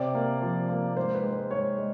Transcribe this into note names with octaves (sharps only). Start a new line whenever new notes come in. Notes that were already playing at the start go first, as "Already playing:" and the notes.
Already playing: C3 D5
A#3
F3
A#3
G#2 C5
B4
G#3
C5
G#2 C#5
G#3